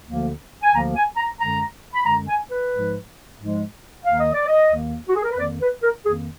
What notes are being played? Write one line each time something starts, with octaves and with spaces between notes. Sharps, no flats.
D2 D3 F3 A#3
G#5
D2 D3 F3 A#3 A#5
G#5
A#5
F#2 D3 G#3 A#5
B5
F#2 D3 G#3 A#5
G#5
B4
G#2 F3 G#3
G#2 F3 G#3
D#2 D#3 A#3 F5
D#5
D5
D#5
D#2 D#3 A#3
F#4
G#4
A#4
B4
F2 D#3 A#3 D5
B4
A#4
F2 D#3 A#3 G#4